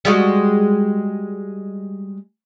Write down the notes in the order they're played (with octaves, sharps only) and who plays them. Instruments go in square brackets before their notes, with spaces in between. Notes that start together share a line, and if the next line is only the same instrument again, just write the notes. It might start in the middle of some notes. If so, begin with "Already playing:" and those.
[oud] G3 G#3 F#4